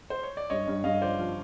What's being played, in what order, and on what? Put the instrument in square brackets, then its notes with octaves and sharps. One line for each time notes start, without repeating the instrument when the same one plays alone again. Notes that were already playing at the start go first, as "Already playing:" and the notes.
[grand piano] C5
C#5
D5
[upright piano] G2 [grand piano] C#5 D#5
[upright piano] G2
[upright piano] G2 [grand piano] D#5 F5
[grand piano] D#5
[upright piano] F3 [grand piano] C5 D5
[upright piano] F3